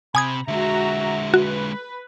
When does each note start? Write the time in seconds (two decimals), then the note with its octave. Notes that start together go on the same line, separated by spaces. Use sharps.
0.15 C3 G#5 B5 D#6 G#6
0.48 D3 G#3 F#4 E5 A#5
1.34 F#4 B4